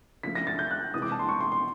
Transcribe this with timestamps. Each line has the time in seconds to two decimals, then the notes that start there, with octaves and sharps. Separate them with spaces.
0.23 C#3 F3 A3 B6
0.35 A#6
0.47 A6
0.59 G6
0.71 F#6
0.94 C3 E3 G#3 D#6
1.02 D6
1.12 A5
1.19 C6
1.29 C#6
1.40 C6
1.52 C6